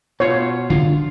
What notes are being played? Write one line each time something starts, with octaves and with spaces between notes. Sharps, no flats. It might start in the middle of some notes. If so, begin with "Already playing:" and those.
B2 F4 C#5
D3 D4 F4